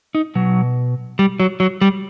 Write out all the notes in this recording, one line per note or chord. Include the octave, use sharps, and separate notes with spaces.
D#4
B2 F#3
G3
F#3
F#3
G3